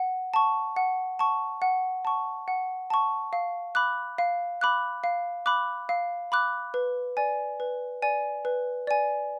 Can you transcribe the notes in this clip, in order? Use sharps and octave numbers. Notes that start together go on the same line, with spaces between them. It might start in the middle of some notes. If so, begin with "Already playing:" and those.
Already playing: F#5
A5 C#6
F#5
A5 C#6
F#5
A5 C#6
F#5
A5 C#6
F5
B5 D6 F#6
F5
B5 D6 F#6
F5
B5 D6 F#6
F5
B5 D6 F#6
B4
D5 G#5
B4
D5 G#5
B4
D5 G#5